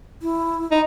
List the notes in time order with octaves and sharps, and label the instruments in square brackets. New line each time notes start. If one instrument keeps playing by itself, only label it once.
[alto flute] E4
[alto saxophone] D#4